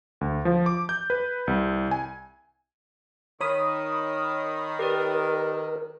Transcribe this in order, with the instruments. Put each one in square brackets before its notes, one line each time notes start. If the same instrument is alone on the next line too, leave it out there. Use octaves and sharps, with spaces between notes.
[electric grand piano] D2
F3
D6
G6
B4
C2
G#5
[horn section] D#3 [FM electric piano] C#5 B5 D#6
[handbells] G4 B4 D5 [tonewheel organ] A#4